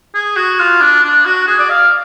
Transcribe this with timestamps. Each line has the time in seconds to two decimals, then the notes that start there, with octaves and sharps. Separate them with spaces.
0.14 G#4
0.36 F#4
0.59 F4
0.81 D4
1.03 D4
1.25 F#4
1.47 G#4
1.59 D5
1.70 F5